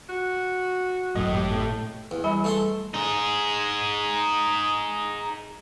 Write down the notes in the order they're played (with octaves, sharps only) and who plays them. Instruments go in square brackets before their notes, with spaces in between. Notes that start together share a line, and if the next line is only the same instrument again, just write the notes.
[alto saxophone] F#4
[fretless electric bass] G#1 F#2 [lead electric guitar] A2 [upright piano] D#5
[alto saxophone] G4
[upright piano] A3
[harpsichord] E2
[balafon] G3 G#5 B5
[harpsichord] A3 A4 C6
[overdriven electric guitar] D#4 G#4